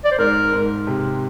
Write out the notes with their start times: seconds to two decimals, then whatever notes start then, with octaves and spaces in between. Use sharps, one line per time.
0.05 D5
0.11 C5
0.18 G#2 A#4
0.53 G#2
0.87 C3